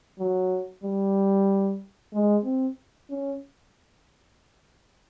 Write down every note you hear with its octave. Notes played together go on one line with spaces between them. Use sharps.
F#3
G3
G#3
C4
C#4